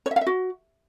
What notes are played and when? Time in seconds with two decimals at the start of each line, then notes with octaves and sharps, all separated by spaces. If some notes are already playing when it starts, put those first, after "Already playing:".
0.06 C#5
0.11 E5
0.16 F5
0.21 E5
0.27 F#4